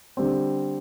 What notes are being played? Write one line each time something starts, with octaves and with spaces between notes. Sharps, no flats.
D3 G3 C4